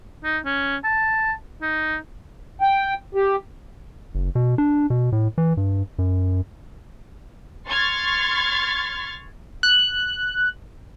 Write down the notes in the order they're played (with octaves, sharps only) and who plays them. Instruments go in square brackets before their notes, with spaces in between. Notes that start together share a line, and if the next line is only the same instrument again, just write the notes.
[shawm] D#4
C#4
A5
D#4
[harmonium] G5
G4
[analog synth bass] F#1
B2
D4
B2
A2
E3
G2
F#2
[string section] C6 C#6 F6 G#6 A6
[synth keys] F#6